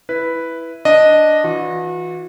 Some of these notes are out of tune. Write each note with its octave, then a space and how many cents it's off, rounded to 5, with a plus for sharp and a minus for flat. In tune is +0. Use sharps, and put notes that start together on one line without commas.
E4 +0 B4 +0
D4 +0 D#5 -5
E3 -5 F#4 -40